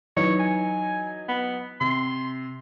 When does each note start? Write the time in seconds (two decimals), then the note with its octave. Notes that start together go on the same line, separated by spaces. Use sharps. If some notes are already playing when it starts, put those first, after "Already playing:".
0.17 E3 F#3 D#4 C#5
0.39 G#5
1.28 B3
1.81 C3 C6